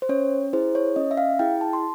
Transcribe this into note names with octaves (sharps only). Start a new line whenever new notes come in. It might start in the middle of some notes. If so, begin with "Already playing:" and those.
C5
C#4 C#5
E4 G#4 C5
C#5
C#4 D#5
E5
F5
E4 G#4 G5
A5
C6